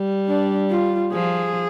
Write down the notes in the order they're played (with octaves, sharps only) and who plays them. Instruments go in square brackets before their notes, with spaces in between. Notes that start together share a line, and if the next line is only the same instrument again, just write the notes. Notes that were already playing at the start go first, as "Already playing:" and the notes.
Already playing: [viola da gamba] G3
[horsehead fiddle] D4
F4
[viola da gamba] F3 [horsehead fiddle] G#4